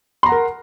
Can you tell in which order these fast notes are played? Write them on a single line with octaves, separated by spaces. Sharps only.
C6 A#5 F#5 A#4